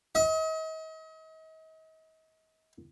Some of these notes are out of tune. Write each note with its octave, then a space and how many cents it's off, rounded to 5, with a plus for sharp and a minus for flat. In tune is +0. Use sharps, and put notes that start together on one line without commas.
D#5 +40